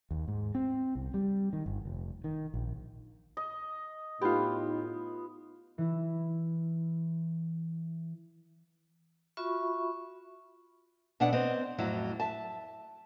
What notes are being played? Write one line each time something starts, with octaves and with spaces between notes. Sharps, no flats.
D#2
G#2
C4
C2
G3
D#3
G1
F1
D#3
A#1
D#5
A2 B3 D#4 F4 G4
E3 E4
F4 F#4 E5 B5 C#6
B2 D4 E5 F#5
B3 C4 D#5
F2 A2 F#3 E4
E5 A5